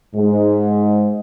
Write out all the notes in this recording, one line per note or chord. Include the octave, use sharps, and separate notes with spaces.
G#2 G#3